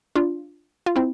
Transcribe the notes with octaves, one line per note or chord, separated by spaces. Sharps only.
D4 F4
F4
C4 E4